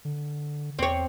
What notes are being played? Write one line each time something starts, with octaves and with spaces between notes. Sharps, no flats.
D3
E2 C4 C#5